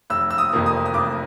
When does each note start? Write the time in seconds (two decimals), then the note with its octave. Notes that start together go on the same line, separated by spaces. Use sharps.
0.10 F1 E6
0.30 E6
0.38 D#6
0.53 F2 C3 F3 A#3
0.66 D#6
0.86 D#6
0.94 F1 D6